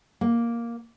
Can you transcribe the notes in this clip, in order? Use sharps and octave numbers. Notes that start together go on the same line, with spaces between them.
A#3